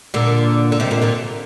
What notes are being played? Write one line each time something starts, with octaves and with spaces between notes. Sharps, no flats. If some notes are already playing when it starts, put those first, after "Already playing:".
A#2 D3
D3
C3 D#3
A#2 D3
A#2 D3